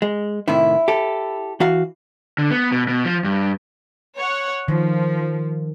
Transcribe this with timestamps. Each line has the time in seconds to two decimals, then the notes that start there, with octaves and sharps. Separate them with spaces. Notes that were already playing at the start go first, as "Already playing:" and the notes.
0.02 G#3
0.48 A2 C3 D#3 E4
0.88 G4 A4
1.60 E3 F#4 F5
2.38 D3
2.51 B3
2.72 B2
2.88 B2
3.05 F3
3.24 G2
4.17 C#5 F#5
4.68 D#3 F3